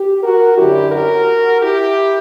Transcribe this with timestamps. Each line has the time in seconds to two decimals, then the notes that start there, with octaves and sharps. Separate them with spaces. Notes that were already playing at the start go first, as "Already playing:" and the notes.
Already playing: G4
0.23 F#4 A#4
0.57 F#2 D3 F#3 E4 G4
0.92 F#4 A#4
1.61 E4 G4